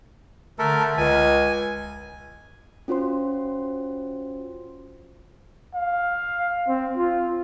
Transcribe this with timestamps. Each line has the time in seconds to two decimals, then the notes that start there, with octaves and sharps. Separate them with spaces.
0.59 D3 A3 A4 A#4
0.98 C#2 G#5
2.88 C#4 F4 F#4 C5 C6
5.74 F5
6.67 C4
6.97 F4